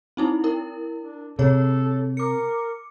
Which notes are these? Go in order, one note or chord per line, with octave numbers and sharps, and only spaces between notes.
C4 D#4 E4
E4 A#4
D4
C3 G#4 A4 C#5
A#4 D6 C#7